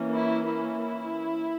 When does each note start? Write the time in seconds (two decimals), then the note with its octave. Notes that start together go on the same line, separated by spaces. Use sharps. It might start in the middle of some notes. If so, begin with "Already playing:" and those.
Already playing: E3 A#3 C#4
0.14 E4
0.48 E4